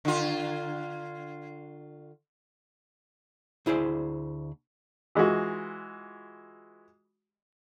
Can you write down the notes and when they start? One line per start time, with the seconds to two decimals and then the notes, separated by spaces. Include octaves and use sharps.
0.05 D3 F4
3.66 D2 E4 G#4 C5 D5
5.15 E3 G#3 F4 F#4